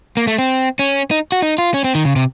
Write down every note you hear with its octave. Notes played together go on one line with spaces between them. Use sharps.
A#3
A3
C4
C#4
D#4
F#4
D#4
F4
C#4
C4
D#3
C#3
C3